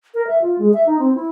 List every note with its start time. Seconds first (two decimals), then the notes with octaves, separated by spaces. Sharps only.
0.14 A#4
0.27 E5
0.42 F4
0.58 G#3
0.74 E5
0.86 D#4
0.99 C4
1.15 E4